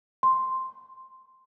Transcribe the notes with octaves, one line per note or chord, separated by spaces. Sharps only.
C6